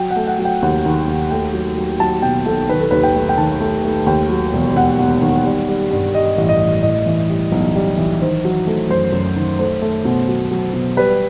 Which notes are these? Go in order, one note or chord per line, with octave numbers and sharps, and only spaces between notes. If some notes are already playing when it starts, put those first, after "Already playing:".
Already playing: F#3 G5
F#5
A3
F#5
F#3
G5
D#2 F#5
D#3
D#2
A3 G5
F#3
F#3
F#3 A5
B2 G5
B1 A4
D#3 B4
A4
D#2 B4
G5
A3
G5
D#3 A5
A3
A3
D#2 G5
F#3
E1
E1 F#5
E1
D#3
G3
G3
G2
G3 D#5
A1
D#5
A1
A2 D#5
E3
G3
B1
G3
E3
D#3 C5
F#3
A3
F#2 C5
F#2
D#3
A3 C5
A3
B2
F#3
F#3
B2
G3 B4